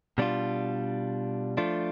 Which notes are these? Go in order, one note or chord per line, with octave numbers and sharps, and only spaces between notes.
B2 G3 D4 F4
F3 A3 D4 F4